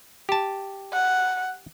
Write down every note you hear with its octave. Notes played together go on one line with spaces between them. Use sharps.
G4 A5
F#5